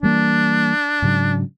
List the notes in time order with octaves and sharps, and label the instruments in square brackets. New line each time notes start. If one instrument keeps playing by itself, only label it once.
[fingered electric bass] E3 G3 A#3 [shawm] D4
[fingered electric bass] G#2 C#3 F#3